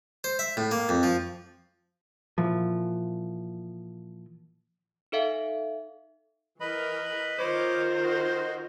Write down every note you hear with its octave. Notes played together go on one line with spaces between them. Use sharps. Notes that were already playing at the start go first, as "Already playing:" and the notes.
C5
E5
A2
A#3
F2
F3
A#2 E3 F3
D#4 A4 E5 F5
E3 A#4 B4 D#5 B5
D#3 F4 A#4 C5 C#5 D#5 D6
F#4 D#5